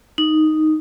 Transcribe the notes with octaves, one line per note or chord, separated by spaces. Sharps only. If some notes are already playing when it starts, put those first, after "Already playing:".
D#4